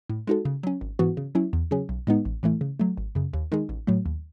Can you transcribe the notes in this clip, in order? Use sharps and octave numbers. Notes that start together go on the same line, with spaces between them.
A2
G#3 D#4 F#4 A4
C#3
F#3 C#4
G#1
G#2 E3 B3 F#4
C#3
F#3 C#4 E4
E2
C#3 F#3 C#4 G#4
B1
A2 G#3 B3 D#4
A1
A2 E3 A3 E4
C#3
F#3 A3
G#1
F#2 C#3
D#2
D#3 G#3 D#4 G#4
A1
A2 F#3 A3
D#2